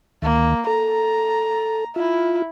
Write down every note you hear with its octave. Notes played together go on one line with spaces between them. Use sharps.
D2 D#3 A#3
A4 A#5
E4 F4